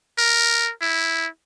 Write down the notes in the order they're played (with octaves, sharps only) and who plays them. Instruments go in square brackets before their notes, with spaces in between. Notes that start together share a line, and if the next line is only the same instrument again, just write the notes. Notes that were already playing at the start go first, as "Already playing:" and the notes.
[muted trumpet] A#4
E4